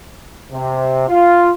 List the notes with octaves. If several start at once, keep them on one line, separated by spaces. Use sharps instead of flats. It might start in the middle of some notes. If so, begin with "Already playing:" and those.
C3
F4